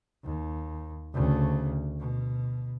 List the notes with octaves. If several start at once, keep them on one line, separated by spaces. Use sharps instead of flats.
D#2
D2 C#3
B2